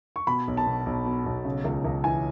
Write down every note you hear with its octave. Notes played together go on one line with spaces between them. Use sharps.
C#6
B2 B5
B1
A5
B2
B1
B2
B1
C#3
C#2
C#2
E3 G#5